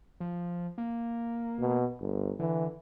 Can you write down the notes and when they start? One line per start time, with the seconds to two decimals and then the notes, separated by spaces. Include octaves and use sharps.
0.20 F3
0.78 A#3
1.59 B2
2.00 G1
2.39 D3 E3